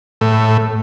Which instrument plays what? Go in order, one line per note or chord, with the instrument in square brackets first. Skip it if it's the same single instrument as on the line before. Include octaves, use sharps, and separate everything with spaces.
[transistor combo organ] A2